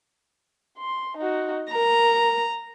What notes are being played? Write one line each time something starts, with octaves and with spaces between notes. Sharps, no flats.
C6
D#4 F#4
A#4 A#5